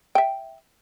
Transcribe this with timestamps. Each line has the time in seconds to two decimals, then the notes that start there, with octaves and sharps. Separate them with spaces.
0.15 E5 G5